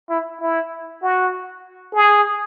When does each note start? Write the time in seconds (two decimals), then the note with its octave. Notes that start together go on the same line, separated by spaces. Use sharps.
0.10 E4
0.41 E4
1.02 F#4
1.94 G#4